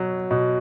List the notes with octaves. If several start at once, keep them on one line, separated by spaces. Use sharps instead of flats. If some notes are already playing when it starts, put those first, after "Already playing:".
Already playing: B2 F#3
B2